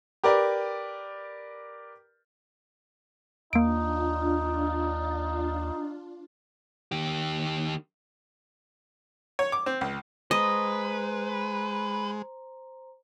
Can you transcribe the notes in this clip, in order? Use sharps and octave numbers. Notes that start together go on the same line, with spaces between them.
G4 A#4 B4 D5
D#2 A#3 D4 D#4 F4 D7
D#3 G4
C#5
D6
C4
C#2
G#3 B4 C5 D#5 A#5 C6